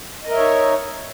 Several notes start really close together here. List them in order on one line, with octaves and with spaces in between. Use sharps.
D#5 A#4 E5 C#5 D#4